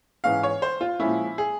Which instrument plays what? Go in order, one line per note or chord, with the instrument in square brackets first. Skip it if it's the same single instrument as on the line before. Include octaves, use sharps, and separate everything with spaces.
[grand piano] G#2 E3 G#3 C#4 F5
C#5
C5
F4
A#2 F3 G#3 C#4 E4
G#4